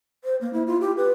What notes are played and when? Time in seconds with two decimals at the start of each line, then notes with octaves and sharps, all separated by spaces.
0.24 C5
0.41 A#3
0.53 E4
0.67 F4
0.81 G4
0.97 B4